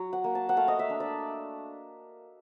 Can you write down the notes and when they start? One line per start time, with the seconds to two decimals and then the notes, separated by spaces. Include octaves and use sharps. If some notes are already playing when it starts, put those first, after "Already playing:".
Already playing: F#3
0.13 F#5
0.24 A#3
0.35 A5
0.49 F#5
0.57 A3 F5
0.68 D#5
0.79 E5
0.90 D4
1.00 D5